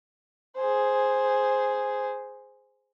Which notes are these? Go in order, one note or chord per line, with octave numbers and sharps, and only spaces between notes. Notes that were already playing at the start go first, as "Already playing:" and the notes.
G#4 C5